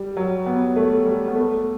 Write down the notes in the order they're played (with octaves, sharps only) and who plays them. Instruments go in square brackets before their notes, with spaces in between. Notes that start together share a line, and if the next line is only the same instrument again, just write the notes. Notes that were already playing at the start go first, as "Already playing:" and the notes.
Already playing: [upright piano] G3
F#3
B3
A3
G3
B3
A3